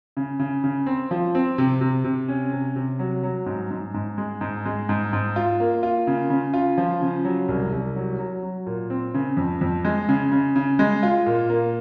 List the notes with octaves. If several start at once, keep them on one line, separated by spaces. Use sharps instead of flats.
C#3
C#3
C#3
C4
F3
C4
C3
C3
C3
C#4
C3
C3
F#3
F#3
G#2
G#2
G#2
G#3
G#2
G#3
G#2
G#2
F4
A#3
F4
C#3
C#3
F4
F3
C#3
F#3
C2
C2
F#3
F#3
F#3
A#2
C4
C#3
F2
F2
G#3
C#3
C#3
C#3
G#3
F4
A#2
A#3